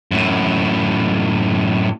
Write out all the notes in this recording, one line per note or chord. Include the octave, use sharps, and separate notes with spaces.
F#2 A2